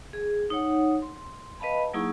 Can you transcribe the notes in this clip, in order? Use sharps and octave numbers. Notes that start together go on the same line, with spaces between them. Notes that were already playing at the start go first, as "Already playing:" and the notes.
G#4
D#4 C#5 F#5
C6
B4 D#5 F5 A5 B5
F#3 A#3 D#4 E4 G#4 C#6